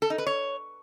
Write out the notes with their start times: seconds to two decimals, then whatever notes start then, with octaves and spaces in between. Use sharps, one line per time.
0.02 A4
0.10 D#4
0.18 B4
0.27 C#5